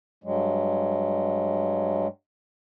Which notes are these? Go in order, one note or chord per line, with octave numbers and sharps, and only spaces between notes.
G2 F#3 G#3